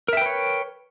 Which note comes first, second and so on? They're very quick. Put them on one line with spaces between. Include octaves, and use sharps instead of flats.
A#4 E5 G5 B4 C#5